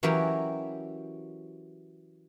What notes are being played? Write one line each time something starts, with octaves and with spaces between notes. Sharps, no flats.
E3 F#3 C#4 F#4 G4 A#4